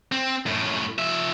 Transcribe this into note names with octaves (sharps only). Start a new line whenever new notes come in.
C4
F#2 A2
F3 E5